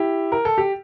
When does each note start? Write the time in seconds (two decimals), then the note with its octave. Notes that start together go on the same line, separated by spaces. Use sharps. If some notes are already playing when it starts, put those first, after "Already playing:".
Already playing: E4 G4
0.32 A#4
0.45 A4
0.58 G4